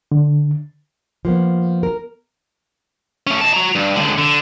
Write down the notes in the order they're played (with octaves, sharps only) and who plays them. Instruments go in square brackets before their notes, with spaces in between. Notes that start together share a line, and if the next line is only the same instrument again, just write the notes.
[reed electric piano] D3
[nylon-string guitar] F3 A#3 B3
A#4
[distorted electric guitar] A3 C#4
D#5 A5
F#4 A#5
G2
C#2 D3
D3